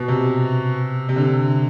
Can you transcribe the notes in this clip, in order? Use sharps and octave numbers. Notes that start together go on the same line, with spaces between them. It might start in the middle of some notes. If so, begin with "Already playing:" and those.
Already playing: B2
C3
C3
D3